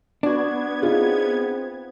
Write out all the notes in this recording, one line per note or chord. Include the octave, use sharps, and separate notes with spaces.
B3 D4 F#4 G#6
C4 D#4 F4 G#4